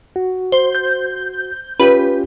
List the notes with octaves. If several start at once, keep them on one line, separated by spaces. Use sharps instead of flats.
F#4
C5
G6
C#4 F4 G4 B4